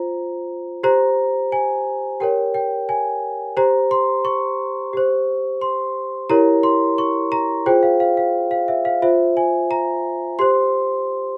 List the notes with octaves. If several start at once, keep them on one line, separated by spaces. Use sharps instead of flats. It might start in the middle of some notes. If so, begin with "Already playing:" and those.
Already playing: F4 C5 A#5
G4 C5 A#5
G#5
G4 A#4 C#5 G5
G5
G#5
G4 C5 A#5
C6
C#6
G4 C5
C6
E4 G4 A#4 C#5 A#5
C6
C#6
A#5
F4 G#4 C5 G5
F5
F5
F5
F5
E5
F5
F4 C5 E5
G#5
A#5
G4 C5 C6